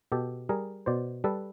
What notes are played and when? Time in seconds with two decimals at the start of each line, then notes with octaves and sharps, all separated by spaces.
0.12 B2 G4 A4
0.49 G3 G#4 A#4
0.86 B2 C5 D5
1.24 G3 A4 B4